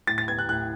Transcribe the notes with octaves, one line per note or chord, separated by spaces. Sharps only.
A2 A6
A6
B3 G#6
F#6
A2 F#6